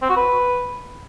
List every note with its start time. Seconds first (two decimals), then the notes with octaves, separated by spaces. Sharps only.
0.02 C4
0.09 F#4
0.16 B4